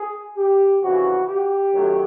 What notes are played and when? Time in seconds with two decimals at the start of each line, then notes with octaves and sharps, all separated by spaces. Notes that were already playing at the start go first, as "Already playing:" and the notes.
Already playing: G#4
0.37 G4
0.82 F2 C#3 E3 F#4
1.28 G4
1.73 F#2 D#3 F#3 A3